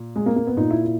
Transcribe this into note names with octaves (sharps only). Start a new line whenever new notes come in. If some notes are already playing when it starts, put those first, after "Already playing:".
Already playing: A#2
G#3
A#3
A#3
B3
A#2 D#4
E4
E4